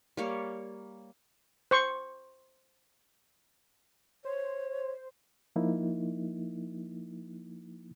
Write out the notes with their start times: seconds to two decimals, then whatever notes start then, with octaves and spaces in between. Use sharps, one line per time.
0.17 G3 A#3 C#5
1.71 C5 C#6
4.25 C5 C#5
5.56 F3 A#3 D#4 E4